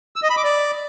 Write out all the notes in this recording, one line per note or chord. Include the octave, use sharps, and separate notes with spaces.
E6
D#5
B5
D6
D5